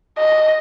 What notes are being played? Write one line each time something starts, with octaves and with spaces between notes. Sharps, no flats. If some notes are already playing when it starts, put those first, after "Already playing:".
D#5